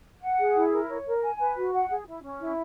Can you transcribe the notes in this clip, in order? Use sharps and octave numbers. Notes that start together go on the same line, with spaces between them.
F#5
G#4
E4
A#4
C#5
A#4
G#5
B4
F#4
F#5
G#4
E4
C#4
E4